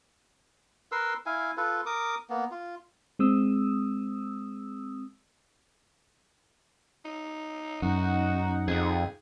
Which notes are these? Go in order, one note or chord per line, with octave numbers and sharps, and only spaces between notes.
A#4 B4 C6 E6
E4 F5 G#5
F4 A4 B4
A#4 D6 D#6
A#3 B3
F4
G#3 C4 D#6 E6
D#4
F#2 D#4 F#4 F#5
F2 G#4